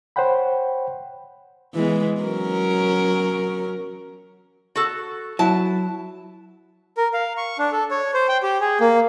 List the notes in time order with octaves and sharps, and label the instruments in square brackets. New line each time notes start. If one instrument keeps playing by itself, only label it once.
[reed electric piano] C5 C#5 F#5 G5 B5
[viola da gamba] E3 G#3 B3
F#3 C#4 A#4
[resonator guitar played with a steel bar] F#4 A4
[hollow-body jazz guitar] F#3 E4 [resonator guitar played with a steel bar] A5
[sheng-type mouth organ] A#4
F5
C#6
D4
A4
C#5
C5
G5
G4
G#4
A#3